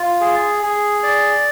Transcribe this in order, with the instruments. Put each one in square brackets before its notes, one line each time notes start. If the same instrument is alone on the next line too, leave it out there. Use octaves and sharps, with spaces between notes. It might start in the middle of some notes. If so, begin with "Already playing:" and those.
Already playing: [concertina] F4
G#4
G#4
D5